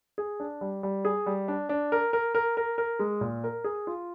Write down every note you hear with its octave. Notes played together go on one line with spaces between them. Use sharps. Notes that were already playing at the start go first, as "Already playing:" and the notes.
G#4
D4
G3
G3
G#4
G3
D4
D4
A#4
A#4
A#4
A#4
A#4
G#3
A#2
A#4
G#4
F4